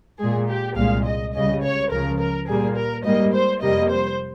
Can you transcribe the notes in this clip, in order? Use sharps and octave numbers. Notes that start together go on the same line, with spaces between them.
A#2 G#3 G#4
G4
C2 A#2 G#3 F5
D#5
C#2 C#3 G3 D#5
C#5
C#2 C#3 F3 A#4
A#4
A#2 G3 A#3 G#4
A#4
G#2 G3 A#3 D#5
C5
F2 C3 G3 A#3 D#5
C5